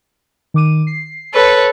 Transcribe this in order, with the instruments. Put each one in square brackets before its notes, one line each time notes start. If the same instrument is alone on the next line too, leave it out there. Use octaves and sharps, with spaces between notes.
[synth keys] D#3 D6 D#7
C7
[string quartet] A4 B4 C#5